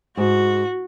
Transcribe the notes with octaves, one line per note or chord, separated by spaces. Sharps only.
G#2 F#4